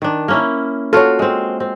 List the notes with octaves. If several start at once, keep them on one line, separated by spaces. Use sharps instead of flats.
D#3 D4
A#3 C#4 E4
F4 F#4 A4 C#5
G#3 C4
C4